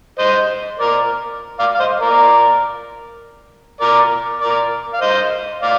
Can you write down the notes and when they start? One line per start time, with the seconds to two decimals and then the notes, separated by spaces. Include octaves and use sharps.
0.19 C5 D#5
0.79 A#4 D5
1.59 D5 F5
1.75 F5
1.80 C5 D#5
2.00 A#4 D5
3.81 A#4 D5
4.41 A#4 D5
4.93 F5
5.01 C5 D#5
5.62 D5 F5